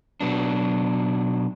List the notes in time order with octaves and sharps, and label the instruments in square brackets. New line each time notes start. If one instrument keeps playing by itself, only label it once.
[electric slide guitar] B2 F#3 D4